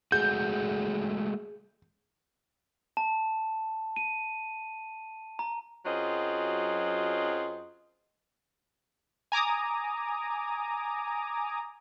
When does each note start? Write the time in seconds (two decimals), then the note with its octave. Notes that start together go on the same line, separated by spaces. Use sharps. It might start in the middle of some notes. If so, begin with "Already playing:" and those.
0.12 G#3 A3 F#4 G#4 G6
2.97 A5
3.96 D#7
5.39 A#5
5.86 F#2 F#3 C4 F4 G#4 D#5
9.32 G#5 A#5 D6 D#6